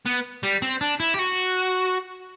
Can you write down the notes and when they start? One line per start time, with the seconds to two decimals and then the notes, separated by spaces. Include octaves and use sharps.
0.06 B3
0.43 G3
0.62 C4
0.81 D4
1.00 E4
1.14 G4
1.19 F#4